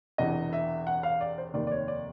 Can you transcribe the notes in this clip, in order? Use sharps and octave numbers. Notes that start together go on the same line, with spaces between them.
E1 E2 C3 E3 D#5
E5
F#5
F5
D5
C5
F1 D#2 D#3 D5
D5
C#5
D5